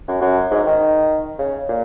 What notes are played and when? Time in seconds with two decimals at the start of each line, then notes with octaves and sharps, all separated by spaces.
0.08 F#2
0.22 F#2
0.51 G#2
0.66 D#3
1.39 C#3
1.69 A#2